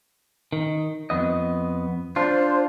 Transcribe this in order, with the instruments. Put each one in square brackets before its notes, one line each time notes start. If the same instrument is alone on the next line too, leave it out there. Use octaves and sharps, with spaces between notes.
[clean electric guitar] D#3
F2 B3 D#5
[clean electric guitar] D4 F4 [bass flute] C5